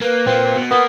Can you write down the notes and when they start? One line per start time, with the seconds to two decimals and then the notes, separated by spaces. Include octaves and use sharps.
0.02 A#3 B4
0.27 A#2 A#3 C4
0.57 B2
0.71 A#3 B3 D#6